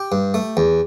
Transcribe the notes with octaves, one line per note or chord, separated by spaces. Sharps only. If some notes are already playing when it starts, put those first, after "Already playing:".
Already playing: G4
G2
A3
E2